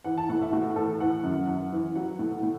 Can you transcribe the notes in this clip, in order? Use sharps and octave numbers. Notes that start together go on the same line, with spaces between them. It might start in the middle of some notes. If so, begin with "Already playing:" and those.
E3 F#5
A5
A2 F#5
E5
A2 F#4
E3 A4
E3 F#5
F#2
F#2
E3
F#3 F#5
A2
A2